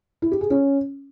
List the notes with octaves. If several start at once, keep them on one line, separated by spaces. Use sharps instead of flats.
E4
G4
G#4
C#4